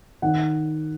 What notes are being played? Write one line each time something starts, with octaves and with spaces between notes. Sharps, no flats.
D#3 F#5